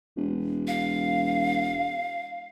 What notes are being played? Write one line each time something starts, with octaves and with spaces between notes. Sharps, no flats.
E1
F5